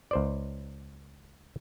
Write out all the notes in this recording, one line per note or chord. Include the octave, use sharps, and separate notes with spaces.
C#2 C5 D5